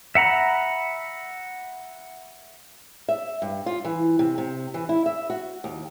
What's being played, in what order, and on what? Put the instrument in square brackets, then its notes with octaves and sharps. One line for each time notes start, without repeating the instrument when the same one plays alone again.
[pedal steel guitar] E5 F#5 A#5 B5
[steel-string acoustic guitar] E5
G2
F4
E3
C3
C3
E3
E4
E5
F#4
D#2